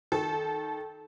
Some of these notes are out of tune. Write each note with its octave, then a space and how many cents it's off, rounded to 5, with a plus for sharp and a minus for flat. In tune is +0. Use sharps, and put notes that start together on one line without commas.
D#3 +0 A4 -15